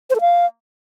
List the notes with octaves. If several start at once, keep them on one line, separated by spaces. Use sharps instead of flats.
C5
A4
F5